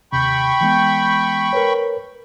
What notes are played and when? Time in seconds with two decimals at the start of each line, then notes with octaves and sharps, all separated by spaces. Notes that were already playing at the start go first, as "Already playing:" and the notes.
0.13 D#2 C3 G5 B5 C#6
0.61 E3 G#3 B3
1.53 A#4 B4 C#5